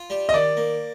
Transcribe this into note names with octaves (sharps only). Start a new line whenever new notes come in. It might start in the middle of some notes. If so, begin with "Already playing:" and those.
Already playing: F4
G3
D#5
D#3 D5
A#3